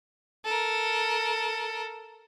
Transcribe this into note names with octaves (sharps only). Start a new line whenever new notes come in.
A4 A#4